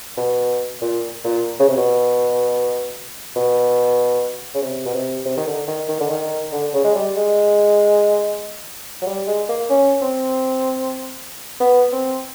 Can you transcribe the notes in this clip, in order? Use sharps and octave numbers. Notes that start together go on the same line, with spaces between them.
B2
A#2
A#2
C#3
C3
B2
B2
C#3
C3
B2
C3
C3
D#3
D3
D#3
D#3
D3
D#3
D3
C#3
G#3
G3
G#3
F#3
G3
G#3
A#3
C#4
C4
B3
C4